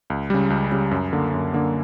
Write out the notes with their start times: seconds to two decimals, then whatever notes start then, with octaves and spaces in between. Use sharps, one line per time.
0.10 C#2
0.30 C#3 G3
0.50 C#2
0.72 C#3 G3
0.91 F#2
1.13 D3 A#3
1.34 F#2
1.54 D3 A#3